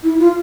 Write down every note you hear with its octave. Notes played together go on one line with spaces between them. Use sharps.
E4
F4